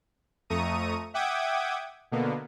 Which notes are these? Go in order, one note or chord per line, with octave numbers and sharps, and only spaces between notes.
F2 A3 A#5 C#6 D#6 D#7
E5 F#5 G5 D6 D#6 G#6
B2 D3 A#3 B3